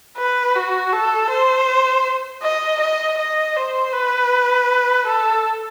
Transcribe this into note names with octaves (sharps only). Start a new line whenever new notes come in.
B4
F#4
A4
C5
D#5
D#5
D#5
C5
B4
A4